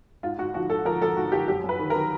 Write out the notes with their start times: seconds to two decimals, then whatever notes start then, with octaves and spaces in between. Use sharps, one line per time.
0.23 G#2 F4
0.39 G#2 F#4
0.54 F3 F#4
0.70 G#2 A4
0.85 F3 A#4
1.02 F3 A4
1.17 G#2 F#4
1.32 F3 G4
1.47 F#2 G4
1.64 F#2
1.69 B4
1.79 D#3
1.90 A#4
1.95 D#3